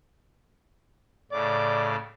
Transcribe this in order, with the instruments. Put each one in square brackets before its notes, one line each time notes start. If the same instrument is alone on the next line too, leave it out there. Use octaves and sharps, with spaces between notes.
[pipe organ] A2 C#3 D6 [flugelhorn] D5